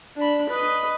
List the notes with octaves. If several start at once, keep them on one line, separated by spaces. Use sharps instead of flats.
D4 B5
B4 D#5